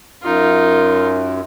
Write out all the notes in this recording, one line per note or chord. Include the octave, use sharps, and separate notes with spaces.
F#2 D#4 F4